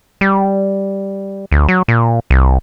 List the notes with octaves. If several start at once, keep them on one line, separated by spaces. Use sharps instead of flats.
G3
D2
F#3
A#2
C2